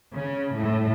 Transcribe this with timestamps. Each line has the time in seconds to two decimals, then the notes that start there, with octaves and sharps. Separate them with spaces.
0.13 C#3
0.55 A2